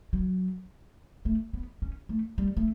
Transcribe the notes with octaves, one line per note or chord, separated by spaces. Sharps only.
F#3
A3
B3
C#4
A3
G3
A3